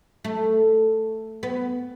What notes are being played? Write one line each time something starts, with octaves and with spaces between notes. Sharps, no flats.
A3
B3